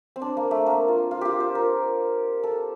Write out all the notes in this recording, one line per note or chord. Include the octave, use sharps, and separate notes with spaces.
C4
D4
A#3
A3
A#3
F4
F4
F4 G4
C5
A#4
A4